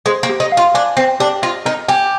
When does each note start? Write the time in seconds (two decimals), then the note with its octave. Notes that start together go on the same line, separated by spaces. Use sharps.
0.06 G#3 C5
0.23 A#3
0.29 G4
0.40 D#4
0.52 F5
0.57 F4
0.74 D4 G#5
0.97 C4 C5
1.20 D4 G4
1.42 F4 D#5
1.65 D#4 A#4
1.88 G4 G#5